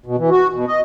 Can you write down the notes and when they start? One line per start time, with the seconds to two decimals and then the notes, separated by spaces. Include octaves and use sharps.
0.06 B2
0.18 E3
0.30 F#4
0.53 B2
0.68 D#5